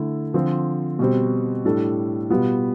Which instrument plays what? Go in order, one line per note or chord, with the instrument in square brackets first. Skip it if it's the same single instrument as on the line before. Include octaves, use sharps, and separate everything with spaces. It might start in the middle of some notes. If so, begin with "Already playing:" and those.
Already playing: [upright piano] D3 A3 E4 A4
D3 F3 C4
B2 G3 C4
A2 G3 D4 A4
B2 G3 B3 F4